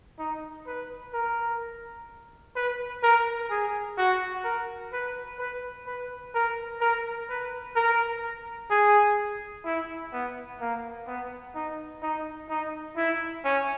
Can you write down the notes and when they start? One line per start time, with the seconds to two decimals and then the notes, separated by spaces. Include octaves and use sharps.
0.18 D#4
0.67 B4
1.13 A#4
2.55 B4
3.03 A#4
3.50 G#4
3.97 F#4
4.44 A#4
4.92 B4
5.39 B4
5.86 B4
6.34 A#4
6.81 A#4
7.29 B4
7.75 A#4
8.70 G#4
9.65 E4
10.13 B3
10.60 A#3
11.07 B3
11.55 D#4
12.02 D#4
12.49 D#4
12.96 E4
13.44 C#4